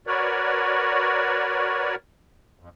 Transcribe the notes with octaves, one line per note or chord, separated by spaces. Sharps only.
F#4 A#4 B4 C#5 D5
F2